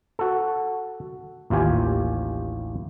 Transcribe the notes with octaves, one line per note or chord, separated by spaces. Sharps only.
F#4 A4
A1 D#2 F4 G4 G#5